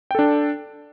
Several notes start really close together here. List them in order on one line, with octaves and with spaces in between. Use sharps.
G5 A4 D4